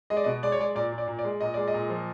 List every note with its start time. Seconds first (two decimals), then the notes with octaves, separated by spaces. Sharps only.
0.10 G#3 D#5
0.17 D5
0.24 B2 D#5
0.43 G#3 D5
0.52 C#5
0.59 G#3 D5
0.75 A#2 D5
0.93 A#2
0.98 D5
1.08 A#2
1.19 D5
1.25 G#3
1.40 A#2 D#5
1.54 G#3 D5
1.68 D#5
1.74 A#2
1.90 F3